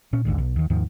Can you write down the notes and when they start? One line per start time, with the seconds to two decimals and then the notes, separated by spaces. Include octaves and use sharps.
0.13 A#2 C#4
0.25 A1 D#2 G#2 D3
0.38 B1
0.56 D#2 D#3
0.70 D#2 G#2 D#3 F3